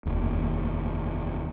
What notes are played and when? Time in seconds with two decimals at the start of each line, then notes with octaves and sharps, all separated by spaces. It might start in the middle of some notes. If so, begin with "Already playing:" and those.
0.06 F1 D#2